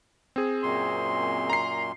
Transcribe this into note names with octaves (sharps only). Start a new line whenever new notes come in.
C4 G#4
F#2 A#2 C6
A#5 C7